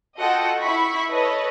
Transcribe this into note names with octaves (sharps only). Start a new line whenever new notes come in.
F4 F#4 A4 D#5 F#5 G5
E4 B5 C#6 B6
A4 B4 C#5 D#5